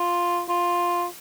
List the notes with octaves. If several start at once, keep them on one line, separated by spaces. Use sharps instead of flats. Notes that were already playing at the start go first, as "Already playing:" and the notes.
Already playing: F4
F4